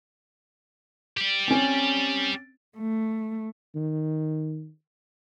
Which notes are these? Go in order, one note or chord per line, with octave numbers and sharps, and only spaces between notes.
G4 D5
C4 C#4
A3
D#3